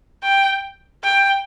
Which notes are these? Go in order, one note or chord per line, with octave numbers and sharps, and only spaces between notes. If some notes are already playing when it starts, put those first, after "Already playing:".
G5
G5